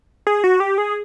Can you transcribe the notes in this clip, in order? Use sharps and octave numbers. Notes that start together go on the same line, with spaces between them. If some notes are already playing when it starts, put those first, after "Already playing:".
G#4
F#4
G4
G#4